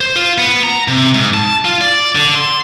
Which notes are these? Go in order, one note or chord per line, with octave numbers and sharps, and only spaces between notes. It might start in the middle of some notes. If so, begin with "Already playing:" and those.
C5
F4
B3
A#5
C3
G#2
A5
F4
D5
D3
C6